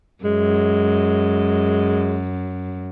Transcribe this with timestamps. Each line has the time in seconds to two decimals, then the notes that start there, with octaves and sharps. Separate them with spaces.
0.24 F#2 G#3